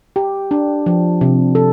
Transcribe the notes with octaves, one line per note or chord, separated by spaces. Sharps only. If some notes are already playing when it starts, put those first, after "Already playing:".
G4
D4
F3
C3
A4